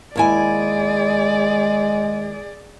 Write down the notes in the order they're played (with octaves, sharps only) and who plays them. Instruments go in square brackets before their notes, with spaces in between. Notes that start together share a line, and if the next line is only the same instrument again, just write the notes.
[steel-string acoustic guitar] D#2 E4 G#5 [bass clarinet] G#3 [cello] G#4 D5